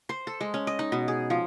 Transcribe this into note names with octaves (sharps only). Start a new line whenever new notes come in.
C5
A4
G#3
C#4
D#5
D#4
B2
G#4
F3